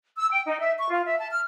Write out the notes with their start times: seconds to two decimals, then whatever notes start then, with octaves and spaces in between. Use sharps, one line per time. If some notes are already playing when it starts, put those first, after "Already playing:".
0.17 E6
0.31 G5
0.47 D#4
0.60 E5
0.78 C#6
0.90 F4
1.06 E5
1.19 A5
1.31 F6